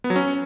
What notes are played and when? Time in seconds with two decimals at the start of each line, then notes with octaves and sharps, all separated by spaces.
0.04 B3
0.10 F#3
0.16 C#4